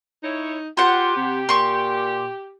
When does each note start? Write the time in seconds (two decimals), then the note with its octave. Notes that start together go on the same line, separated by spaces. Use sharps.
0.23 D#4 E4 C#5
0.77 F4 G4 C5 F#5
1.16 C3
1.49 A#2 C6 C#6